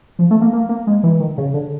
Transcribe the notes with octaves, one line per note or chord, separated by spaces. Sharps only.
F3
A3
A#3
A#3
A#3
G#3
E3
D#3
C#3
D3